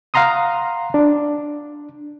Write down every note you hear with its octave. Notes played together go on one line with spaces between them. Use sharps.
F5 F#5 A#5 C6 D#6
D4